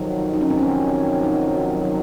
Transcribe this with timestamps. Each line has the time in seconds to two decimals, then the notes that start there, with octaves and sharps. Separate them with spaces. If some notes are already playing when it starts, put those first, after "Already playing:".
Already playing: F2 C3 D#3 F#3 D#4
0.34 D#4
0.41 C#4
0.50 C4
0.58 C#4
1.24 D#4